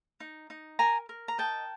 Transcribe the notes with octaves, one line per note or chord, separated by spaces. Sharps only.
D#4
D#4
A#4 G#5 A#5
A#4
A#5
D#5 G5 A5